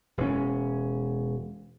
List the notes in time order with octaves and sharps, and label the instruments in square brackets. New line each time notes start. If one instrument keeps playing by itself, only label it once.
[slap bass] E1 C#4